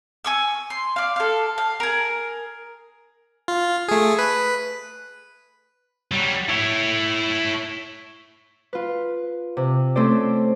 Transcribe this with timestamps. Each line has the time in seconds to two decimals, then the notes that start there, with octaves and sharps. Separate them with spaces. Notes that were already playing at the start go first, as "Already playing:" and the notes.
0.24 G#5 C#6 E6
0.70 C6
0.96 D5 F5
1.16 A4 F5
1.58 F5
1.80 G#4 A#4
3.48 F4
3.88 A3 G#4
4.19 B4
6.11 F#3 G3
6.49 E4 C#5
8.73 F4 B4
9.57 C3
9.96 A3 C4 C#4 A4 C5 D5